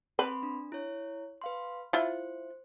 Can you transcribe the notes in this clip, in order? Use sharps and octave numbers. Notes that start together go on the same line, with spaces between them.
C4 B4 B5 C6
D4
E4 C#5
B4 F5 C6
E4 F4 C5